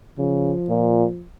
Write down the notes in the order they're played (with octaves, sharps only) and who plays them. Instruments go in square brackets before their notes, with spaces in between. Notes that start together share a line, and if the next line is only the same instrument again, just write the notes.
[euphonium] C#3 [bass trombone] F3
[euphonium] A#2